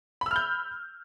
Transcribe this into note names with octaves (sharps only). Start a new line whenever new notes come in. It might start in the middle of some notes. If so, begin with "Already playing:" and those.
B5 E6 F6 G6